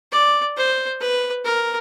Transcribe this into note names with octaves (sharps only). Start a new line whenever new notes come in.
D5
C5
B4
A#4